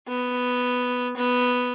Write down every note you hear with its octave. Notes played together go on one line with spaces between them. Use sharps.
B3
B3